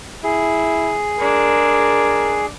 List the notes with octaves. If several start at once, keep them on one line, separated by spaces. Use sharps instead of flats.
E4 G#4
G#3 D4 A#4